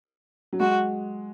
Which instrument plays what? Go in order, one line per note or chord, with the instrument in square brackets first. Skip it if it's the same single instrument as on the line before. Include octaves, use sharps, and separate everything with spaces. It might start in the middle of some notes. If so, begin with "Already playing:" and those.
[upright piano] F#3
[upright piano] G#3 [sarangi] F#4